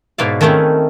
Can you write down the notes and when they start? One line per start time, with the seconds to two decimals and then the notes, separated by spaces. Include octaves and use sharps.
0.18 G#2 B2 E4 C#5 D5 F5
0.41 D#3 A3 C4 C#4 D#4 E4